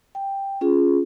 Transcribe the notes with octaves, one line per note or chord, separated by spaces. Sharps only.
G5
C#4 F4 G#4